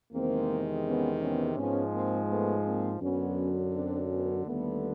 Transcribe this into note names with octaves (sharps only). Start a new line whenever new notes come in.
E2 C3 D#3 G#3 A#3 C4
B3 C#4
B3 C#4
G#2 F3 G#3 B3 C#4
A#3 C4
A3 B3
A#3 C4
F#2 D3 F#3 B3 C#4
C4 D4
B3 C#4
D#2 D3 G3 A3 B3